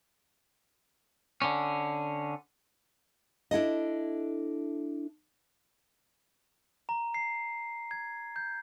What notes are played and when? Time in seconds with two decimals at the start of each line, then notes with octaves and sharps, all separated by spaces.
1.42 D3 C#4
3.51 D4 E4 A4 D#5
6.89 A#5
7.14 C7
7.91 G#6
8.36 G6